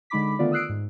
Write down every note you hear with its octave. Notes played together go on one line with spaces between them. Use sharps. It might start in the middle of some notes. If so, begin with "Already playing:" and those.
D3 G#3 D#4 B5 D6 B6
D3 D#3 A3 B3 F4 D5
D#6 E6 F#6 C7 D7
G#2